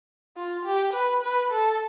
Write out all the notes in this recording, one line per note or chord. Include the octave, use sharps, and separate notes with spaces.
F4
G4
B4
B4
A4